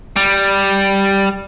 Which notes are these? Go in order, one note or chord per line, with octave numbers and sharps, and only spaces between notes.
G3